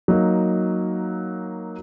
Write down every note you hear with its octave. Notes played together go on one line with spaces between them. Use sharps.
F#3 A#3 D#4